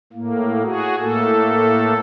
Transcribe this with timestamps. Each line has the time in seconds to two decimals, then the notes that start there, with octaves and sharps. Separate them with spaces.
0.13 A2 A#3
0.63 F#4 G#4
0.98 A2 A3 A#3 A4